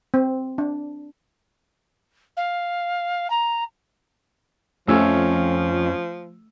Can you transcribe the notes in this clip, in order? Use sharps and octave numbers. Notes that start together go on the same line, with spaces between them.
C4
D4
F5
A#5
F2 F3 A3 C#4 E6